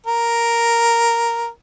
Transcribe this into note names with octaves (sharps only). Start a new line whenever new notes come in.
A#4